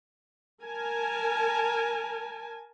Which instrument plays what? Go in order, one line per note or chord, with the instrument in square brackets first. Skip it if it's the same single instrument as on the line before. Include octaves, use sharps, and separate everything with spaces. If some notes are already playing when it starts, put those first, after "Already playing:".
[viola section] A#4 G#5 A5